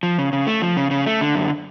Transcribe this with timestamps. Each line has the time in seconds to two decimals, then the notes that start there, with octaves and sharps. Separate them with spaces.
0.03 F3
0.18 C#3
0.33 C#3
0.47 A3
0.62 F3
0.77 C#3
0.91 C#3
1.06 A3
1.21 D3
1.35 F#2